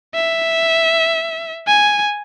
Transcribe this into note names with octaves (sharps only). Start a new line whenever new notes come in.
E5
G#5